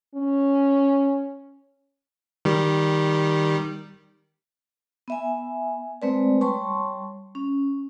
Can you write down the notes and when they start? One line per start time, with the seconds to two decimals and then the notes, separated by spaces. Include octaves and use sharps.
0.15 C#4
2.45 D#3 G3
5.08 B3 E5 G#5
6.02 G#3 A3 C4 B4 C5 D5
6.41 G3 C#5 A5 C6 C#6
7.35 C#4